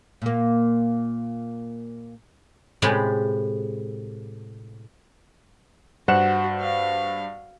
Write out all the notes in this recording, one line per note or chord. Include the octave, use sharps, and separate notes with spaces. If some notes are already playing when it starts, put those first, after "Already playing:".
A#2 A#3
A2 C3 G#3 G4
G2 F#4 C5 F#5 E7
F5